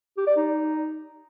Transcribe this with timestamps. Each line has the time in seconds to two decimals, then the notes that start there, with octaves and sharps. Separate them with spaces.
0.17 G4
0.27 D5
0.36 D#4